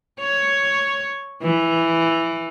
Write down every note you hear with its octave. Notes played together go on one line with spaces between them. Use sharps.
C#5
E3